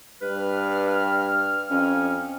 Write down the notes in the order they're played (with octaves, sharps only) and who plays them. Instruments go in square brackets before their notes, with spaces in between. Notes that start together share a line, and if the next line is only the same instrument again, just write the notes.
[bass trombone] G2 [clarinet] B4 [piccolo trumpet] F6
[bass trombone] F2 [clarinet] C#4